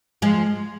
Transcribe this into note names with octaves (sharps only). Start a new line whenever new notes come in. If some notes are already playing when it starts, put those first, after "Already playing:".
F3 G#3